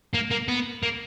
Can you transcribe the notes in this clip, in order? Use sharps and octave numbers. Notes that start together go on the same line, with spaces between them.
A#3
A#3
B3
A#3